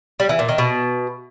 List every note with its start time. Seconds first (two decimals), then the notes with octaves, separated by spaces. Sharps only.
0.20 G3
0.29 E3
0.39 A#2
0.49 D#3
0.58 B2